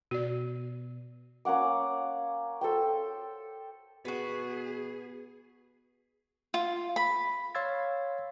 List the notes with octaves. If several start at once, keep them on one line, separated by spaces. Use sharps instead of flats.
B2 F#4 D5
A#3 C#4 F#5 D6
A4 C5 G5
B2 B3 F#4 G#4
F4
B5
C#5 F5 C6 E6 G#6 A6